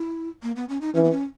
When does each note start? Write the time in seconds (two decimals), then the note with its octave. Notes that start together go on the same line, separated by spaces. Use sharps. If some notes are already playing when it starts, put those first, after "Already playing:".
Already playing: E4
0.43 A#3
0.56 B3
0.69 C#4
0.81 D#4
0.95 E3 C#4
1.04 B3
1.11 C#4